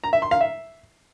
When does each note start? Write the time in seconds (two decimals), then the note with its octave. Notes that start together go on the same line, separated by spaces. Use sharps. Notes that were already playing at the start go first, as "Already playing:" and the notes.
0.04 A#5
0.13 E5
0.22 C6
0.31 F5
0.41 E5